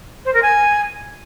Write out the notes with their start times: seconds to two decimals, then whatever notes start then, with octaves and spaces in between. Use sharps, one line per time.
0.25 C5
0.33 A#4
0.42 G#5